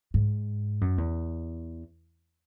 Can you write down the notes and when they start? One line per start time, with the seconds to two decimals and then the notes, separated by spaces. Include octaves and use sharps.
0.14 G#2
0.81 F#2
0.98 E2